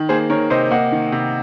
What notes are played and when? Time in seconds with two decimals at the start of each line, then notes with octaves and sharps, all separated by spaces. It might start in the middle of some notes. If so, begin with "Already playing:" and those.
Already playing: D#3
0.09 A#3 G#4 C5
0.30 D#3 A#4 C#5
0.50 C3 C5 D#5
0.71 A#3 D#5 F#5
0.92 D#3
1.12 C3